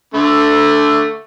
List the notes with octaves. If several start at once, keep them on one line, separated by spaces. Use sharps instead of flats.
D3 A3